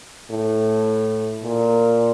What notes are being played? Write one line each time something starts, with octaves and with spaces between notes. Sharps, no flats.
A2
A#2